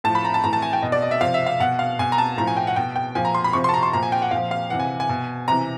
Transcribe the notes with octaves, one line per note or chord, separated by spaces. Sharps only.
A2 F3 A5
B5
A#5
A5
A2 E3 A#5
A5
G#5
G5
B2 D#5
D5
D#5
E5
C3 F3 F5
E5
F5
B2 F#5
F5
B2 G#5
A#5
A5
A2 F3 A#5
G#5
G5
F#5
B2 G5
G5
A#2 F3 G#5
A#5
C6
B5
C3 F3 C#6
A5 C6
A#5
C6
A#2 F3 A#5
G#5
G5
F#5
A#2 F3 F5
F5
C3 E3 F#5
G#5
G#5
B2
C3 E3 A#5